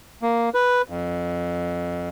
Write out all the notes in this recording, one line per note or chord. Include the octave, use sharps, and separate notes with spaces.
A#3
B4
F2